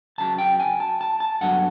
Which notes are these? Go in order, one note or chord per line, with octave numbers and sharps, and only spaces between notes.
C#2 C#3 F#3 A5
G5
G#5
A5
A5
A5
G2 D3 F#3 B3 F#5